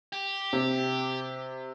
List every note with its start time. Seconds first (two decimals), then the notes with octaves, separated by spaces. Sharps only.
0.13 G4
0.53 C3